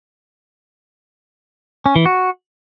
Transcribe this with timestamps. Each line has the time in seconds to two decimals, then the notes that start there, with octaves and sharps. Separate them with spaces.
1.86 C#4
1.96 E3
2.06 F#4